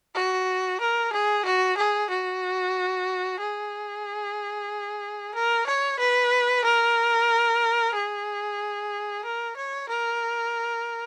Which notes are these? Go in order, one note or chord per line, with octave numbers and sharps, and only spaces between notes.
F#4
A#4
G#4
F#4
G#4
F#4
G#4
A#4
C#5
B4
A#4
G#4
A#4
C#5
A#4